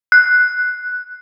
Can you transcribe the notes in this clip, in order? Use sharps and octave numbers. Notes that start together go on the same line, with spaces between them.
F#6